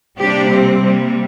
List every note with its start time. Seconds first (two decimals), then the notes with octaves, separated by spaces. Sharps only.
0.19 C3 G3 A#3 D4 G4
0.51 C4
0.83 C3 G3 A#3